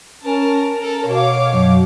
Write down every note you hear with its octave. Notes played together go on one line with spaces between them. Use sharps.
C#4 A#4 A5
A4 A#4
B2 C#5 F5 D6
F#2